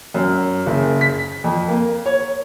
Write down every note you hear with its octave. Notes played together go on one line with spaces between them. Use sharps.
F#2
F#1
B6
F2
A#3
C#5